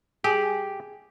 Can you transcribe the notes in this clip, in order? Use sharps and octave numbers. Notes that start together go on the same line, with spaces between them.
G4 G#4